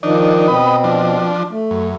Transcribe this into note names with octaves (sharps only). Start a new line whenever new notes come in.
D#3 F3 D4 D#4
B2 C4 B4 D#5
F3 D4
A3
F#2